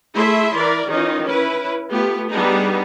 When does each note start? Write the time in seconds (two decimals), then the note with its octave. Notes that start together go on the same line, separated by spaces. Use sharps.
0.13 A3 E4 G#4 E5 C6
0.57 E3 A#4 D5
0.89 D#3 E3 C#4 D#4 F4
1.25 C#4 E4 B4
1.90 A3 B3 F4 G4 B4
2.29 G3 B3 D4 D#4 G#4